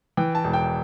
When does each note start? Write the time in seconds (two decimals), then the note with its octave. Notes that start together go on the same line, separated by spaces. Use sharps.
0.17 E3 G5
0.35 A5
0.44 E1
0.53 G5